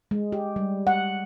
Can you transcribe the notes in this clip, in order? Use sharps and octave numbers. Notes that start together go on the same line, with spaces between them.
G#3
G4
G3
F#5